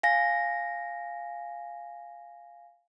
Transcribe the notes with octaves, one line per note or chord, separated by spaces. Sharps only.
F5 G#5 A#6